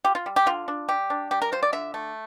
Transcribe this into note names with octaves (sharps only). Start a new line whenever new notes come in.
F4 G4
F4
G3
G4
D3 F4
D4
G3 G4
D4
G3 G4
A#4
F4 C5
D5
D3 E5
A3